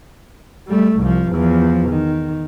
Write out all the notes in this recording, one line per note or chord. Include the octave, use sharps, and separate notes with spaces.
G3 A3
C2 F3
E2 F3
D#3